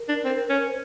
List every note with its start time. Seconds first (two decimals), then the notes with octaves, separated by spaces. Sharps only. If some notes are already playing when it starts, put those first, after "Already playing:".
Already playing: A#4
0.08 D4
0.25 C4
0.50 C#4
0.68 C5